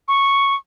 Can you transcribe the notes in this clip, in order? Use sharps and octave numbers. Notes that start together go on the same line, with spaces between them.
C#6